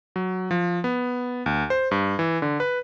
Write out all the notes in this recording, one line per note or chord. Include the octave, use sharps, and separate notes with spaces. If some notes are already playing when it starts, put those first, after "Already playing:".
F#3
F3
B3
D2
C5
G2
E3
D3
B4